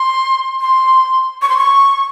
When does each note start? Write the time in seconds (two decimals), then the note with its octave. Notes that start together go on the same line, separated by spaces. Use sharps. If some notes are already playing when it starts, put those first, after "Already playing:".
Already playing: C6
0.61 C6
1.42 C#6
1.49 C6
1.57 C#6